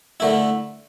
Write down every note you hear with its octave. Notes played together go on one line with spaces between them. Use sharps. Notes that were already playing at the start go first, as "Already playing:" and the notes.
D3 A3 E4